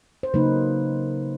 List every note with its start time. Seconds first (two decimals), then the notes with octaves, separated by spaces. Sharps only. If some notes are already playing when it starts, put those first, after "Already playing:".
0.23 C5
0.34 C#3 F#3 A#3 D#4 B4